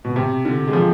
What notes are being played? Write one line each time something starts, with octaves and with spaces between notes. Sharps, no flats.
B2
C3
D3
G#3
F3